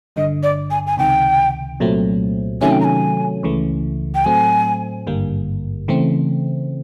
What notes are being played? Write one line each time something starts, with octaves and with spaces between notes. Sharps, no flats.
G1 G2 D3 D#5
D5
G#5
G#5
C#2 C3 D#3 G5
C2 A#2 F#3 A3 C4
C3 D#3 F#3 A3 C#4 G#5
G5
A#5
G#5
C#2 C#3 E3 A3
G5
A2 F#3 A3 C4 G#5
G#1 G2 D3 G3 A#3
C#3 E3 A3 C4